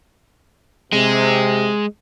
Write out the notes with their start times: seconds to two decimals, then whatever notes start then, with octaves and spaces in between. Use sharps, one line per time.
0.93 C3 G#3